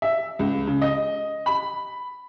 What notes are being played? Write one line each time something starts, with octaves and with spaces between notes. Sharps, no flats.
E5
C#2
C#3
D#5
B5